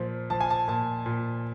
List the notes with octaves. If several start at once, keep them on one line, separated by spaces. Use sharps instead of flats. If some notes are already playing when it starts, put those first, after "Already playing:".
Already playing: A#2 F3
F3 A5
G#5
A5
A#2 A5
A#2